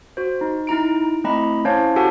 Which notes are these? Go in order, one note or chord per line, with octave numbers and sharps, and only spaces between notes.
F#4 C5
D#4
D#4 E4 A#5 D7
A3 C4 E4 D#5 A#5 B5
C#4 E4 C5 C#5 F5 A5
F#4 G4 A4 F#5 G#5 A5